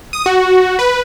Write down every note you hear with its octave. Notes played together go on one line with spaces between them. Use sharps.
D#6
F#4
B4